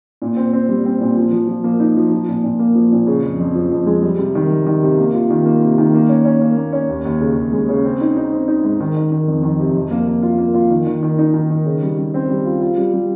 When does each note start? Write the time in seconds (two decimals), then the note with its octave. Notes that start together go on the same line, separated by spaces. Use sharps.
0.22 A#2
0.37 C4
0.53 C4
0.69 G3
0.85 C4
1.01 A#2
1.17 F3
1.33 F3
1.48 F3
1.64 A#3
1.80 D#4
1.96 F3
2.12 F3
2.29 A#2
2.44 A#2
2.59 A#3
2.75 F3
2.92 A#2
3.07 C#3
3.23 F2
3.40 F2
3.55 F3
3.71 F2
3.87 G#3
4.02 G3
4.19 C3
4.35 D#3
4.50 G3
4.66 D#3
4.83 C3
4.98 A#3
5.14 F4
5.30 D#3
5.46 A#3
5.62 C3
5.78 D#3
5.94 A#3
6.09 C#4
6.25 C#4
6.41 A#3
6.57 A#3
6.73 C#4
6.89 D#2
7.05 D#2
7.21 C#3
7.37 D#2
7.53 G#3
7.69 C#3
7.85 C4
8.01 D#4
8.17 D#4
8.32 C4
8.48 D#4
8.64 G#2
8.80 D#3
8.96 D#3
9.12 D#3
9.28 F2
9.43 D#3
9.60 C3
9.75 F2
9.91 A#3
10.07 A#3
10.22 F4
10.38 A#3
10.54 F4
10.70 D#3
10.86 D#3
11.02 D#3
11.18 D#4
11.34 D#3
11.50 D#3
11.65 C#3
11.83 G3
11.98 G3
12.14 C4
12.30 G3
12.46 F4
12.61 F4
12.78 G3
12.94 G3